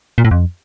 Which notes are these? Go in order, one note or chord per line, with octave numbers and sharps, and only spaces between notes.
A#2
A2
F2